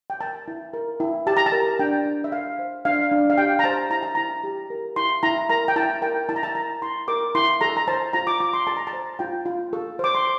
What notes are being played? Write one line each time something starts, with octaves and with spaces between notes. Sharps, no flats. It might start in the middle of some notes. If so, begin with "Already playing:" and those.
G5
A#4 A5
E4
A#4
E4
G4 A5
A#5
A5
A#4
D4 G5
D4
E5
A4 F5
C5
D4 F5
D4
F5
G4 G5
A#5
C5 A5
E4 A#5
A5
E4 A#5
G4
A#4
E4 C6
E4 A#5
A#4 A#5
G5
E4 A5
A#4 G5
E4 A5
A#5
A5
A#4 A#5
E4 C6
A#4 D6
E4 C6
A4 A#5
A#5
C5 A5
F4 A#5
D6
F4 D6
C6
A4 A5
A#5
A5
C5
F4 G5
F4
A4
C5 D6
C6